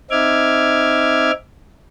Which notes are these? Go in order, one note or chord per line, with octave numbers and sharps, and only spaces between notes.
C4 D#4 E5 D6 F6 G#6